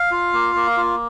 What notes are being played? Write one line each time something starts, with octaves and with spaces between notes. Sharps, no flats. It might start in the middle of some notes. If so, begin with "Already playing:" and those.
Already playing: F5
F4
A#3
A#3
F4